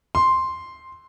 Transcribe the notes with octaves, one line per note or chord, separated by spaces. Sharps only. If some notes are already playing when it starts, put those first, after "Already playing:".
C6